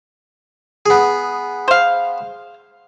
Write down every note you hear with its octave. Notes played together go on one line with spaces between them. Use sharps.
B3 G#4
C5 F5